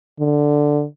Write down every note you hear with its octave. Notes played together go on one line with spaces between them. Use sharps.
D3